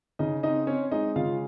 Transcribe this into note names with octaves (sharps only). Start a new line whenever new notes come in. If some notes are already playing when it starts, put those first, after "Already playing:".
C#3 D#4 D#5
C4 D#4 D#5
C4 C#4 C#5
G#3 D#4 D#5
C#3 F4 F5